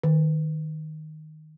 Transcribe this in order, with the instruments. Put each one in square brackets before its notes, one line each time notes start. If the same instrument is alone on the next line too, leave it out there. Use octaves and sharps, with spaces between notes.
[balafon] D#3